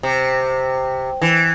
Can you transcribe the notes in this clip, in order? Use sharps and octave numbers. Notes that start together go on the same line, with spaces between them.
C3
E3